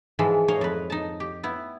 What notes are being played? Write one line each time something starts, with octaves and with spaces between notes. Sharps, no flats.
G#2 E3 F3 G#3
A#4 C5 C#5 D#5 F5
F2 B4
D#4 A5
G4
B3 E4